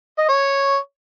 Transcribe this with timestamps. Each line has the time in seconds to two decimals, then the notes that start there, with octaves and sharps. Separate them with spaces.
0.18 D#5
0.29 C#5